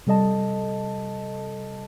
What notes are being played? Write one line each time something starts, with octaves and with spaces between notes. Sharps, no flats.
C3 G3 A4 D#5 A5